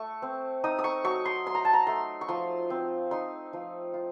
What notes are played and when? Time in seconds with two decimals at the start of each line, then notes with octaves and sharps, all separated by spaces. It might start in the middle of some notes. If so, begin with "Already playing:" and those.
Already playing: A3 C#6
0.22 C4
0.64 D#4 D#6
0.79 D#6
0.84 C#6
1.04 F#3 C#6
1.25 C6
1.46 F#3 C6
1.55 A#5
1.65 A5
1.73 A#5
1.87 A3 C6
2.21 C#6
2.28 F3 C6
2.70 C4
3.11 D#4 C6
3.53 F3
3.94 F4